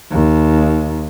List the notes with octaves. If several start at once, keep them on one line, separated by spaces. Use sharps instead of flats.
D#2